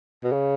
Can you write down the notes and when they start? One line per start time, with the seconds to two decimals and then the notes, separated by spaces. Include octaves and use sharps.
0.24 B2
0.32 C#3